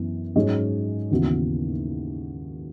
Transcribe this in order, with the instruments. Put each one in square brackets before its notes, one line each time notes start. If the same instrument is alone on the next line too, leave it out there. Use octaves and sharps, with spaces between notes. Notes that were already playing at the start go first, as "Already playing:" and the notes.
Already playing: [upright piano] F#2 E3 B3
G#2 F#3 C#4 G#4 D#5
D#2 C#3 E3 B3 F#4